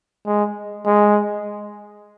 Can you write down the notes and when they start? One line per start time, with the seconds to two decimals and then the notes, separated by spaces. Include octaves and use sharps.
0.26 G#3
0.86 G#3